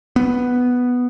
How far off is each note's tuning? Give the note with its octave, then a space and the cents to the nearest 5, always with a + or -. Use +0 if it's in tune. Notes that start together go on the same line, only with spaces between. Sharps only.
B3 +0